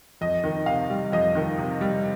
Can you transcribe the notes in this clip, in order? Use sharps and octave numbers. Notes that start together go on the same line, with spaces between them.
F2 D#5
D#3
C3 F5
G3
F2 D#5
D#3
C3
G3